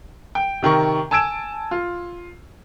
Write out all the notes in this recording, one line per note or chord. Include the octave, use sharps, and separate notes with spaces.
G5
C3 D#3 A#4 C#6
G#5 A5 E6 G#6 D7 E7
F4